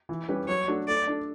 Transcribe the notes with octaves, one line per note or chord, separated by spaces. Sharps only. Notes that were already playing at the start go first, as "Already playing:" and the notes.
E3
G3 C#4 G4 B4
F#3 C#5
A3 D4 F#4 A4
A3 D5
D4 A4